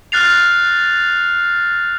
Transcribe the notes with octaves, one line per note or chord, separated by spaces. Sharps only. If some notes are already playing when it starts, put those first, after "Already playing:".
F6 F#6 A6 C7 F7